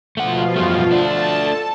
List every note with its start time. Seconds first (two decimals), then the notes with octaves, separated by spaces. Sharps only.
0.17 B2 F3 A3 F4 F#5
0.56 F#2 G3 A3
0.91 A3 D4 A5
1.40 A4 A5